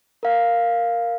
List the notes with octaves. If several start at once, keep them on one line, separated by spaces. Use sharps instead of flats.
A#4 F5